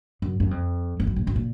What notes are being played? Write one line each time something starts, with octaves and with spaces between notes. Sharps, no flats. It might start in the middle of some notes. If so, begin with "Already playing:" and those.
F#2
F#2
F2
F2
F#2
A#2
F#2
A#2